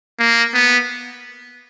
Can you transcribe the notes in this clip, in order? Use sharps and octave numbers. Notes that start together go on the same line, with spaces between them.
A#3
B3